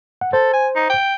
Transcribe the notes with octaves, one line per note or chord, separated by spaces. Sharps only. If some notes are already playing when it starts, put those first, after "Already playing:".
F#5
A4 C5
G#5
D#4
G5